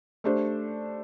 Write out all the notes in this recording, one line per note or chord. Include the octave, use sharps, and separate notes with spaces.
A3 D4 G4 C5